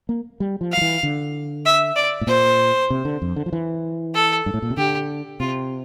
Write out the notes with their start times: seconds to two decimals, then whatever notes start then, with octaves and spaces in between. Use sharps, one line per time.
0.09 A#3
0.40 G3
0.61 F3
0.72 F5
0.77 F3
0.81 E3
1.03 D3
1.66 E5
1.96 D5
2.21 A2
2.27 A#2 C5
2.90 C3
3.05 D3
3.22 F2
3.36 D3
3.46 F3
3.53 E3
4.15 A4
4.46 G2
4.54 A2
4.62 A#2
4.70 C3
4.77 D3 G4
5.40 C3 F4